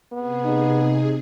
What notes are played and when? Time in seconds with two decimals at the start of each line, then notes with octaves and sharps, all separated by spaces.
0.13 C3 B3 G#4
0.45 D#4